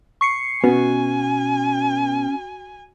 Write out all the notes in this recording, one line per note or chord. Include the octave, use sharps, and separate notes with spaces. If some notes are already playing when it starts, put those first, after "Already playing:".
C#6 C7 C#7
B2 B3 C#4 F#4 G#5